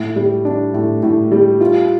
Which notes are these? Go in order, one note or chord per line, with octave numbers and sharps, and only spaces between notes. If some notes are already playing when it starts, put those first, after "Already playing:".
Already playing: A2
G3
D4
A2
A2
G3
F4